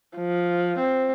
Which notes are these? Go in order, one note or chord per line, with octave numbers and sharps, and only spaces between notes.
F3
C4